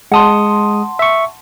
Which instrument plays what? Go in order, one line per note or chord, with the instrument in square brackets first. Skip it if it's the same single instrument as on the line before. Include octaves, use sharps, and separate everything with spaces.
[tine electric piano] G#3 D#6 [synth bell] F#5 A5 C6
[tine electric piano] E5 C#6